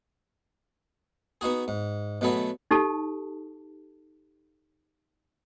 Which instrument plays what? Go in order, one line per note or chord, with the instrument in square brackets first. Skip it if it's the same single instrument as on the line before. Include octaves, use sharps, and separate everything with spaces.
[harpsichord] B3 D#4 F#4 G#4
G#2
B2 F#3 A3 G#4 B4 D#5
[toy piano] D#4 G4 A4 A5